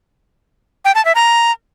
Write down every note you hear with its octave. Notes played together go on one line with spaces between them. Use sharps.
G5
A5
E5
A#5